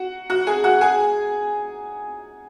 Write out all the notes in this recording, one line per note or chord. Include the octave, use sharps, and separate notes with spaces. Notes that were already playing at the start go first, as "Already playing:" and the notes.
Already playing: F#4 F#5
F#4 F#5
G#4 G#5
F#4 F#5
G#4 G#5